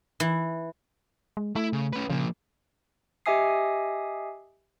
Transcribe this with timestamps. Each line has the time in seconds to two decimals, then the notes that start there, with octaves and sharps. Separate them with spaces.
0.20 E3
1.37 G#3
1.56 A3 E4
1.73 C#3
1.93 C#4 B4
2.09 C#3 F3 A#3
3.26 G4 D#5 E5 G#5 D#6 C7